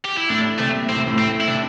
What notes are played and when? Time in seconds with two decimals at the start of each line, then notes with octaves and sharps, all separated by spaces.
0.05 G4
0.17 E4
0.29 A2 D4
0.59 C3 A3
0.89 A2 C4
1.07 A2
1.18 C4
1.41 E4
1.48 C3 D4